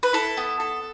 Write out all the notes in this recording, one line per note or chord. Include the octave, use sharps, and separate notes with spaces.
B4
E4 A4
B3
A4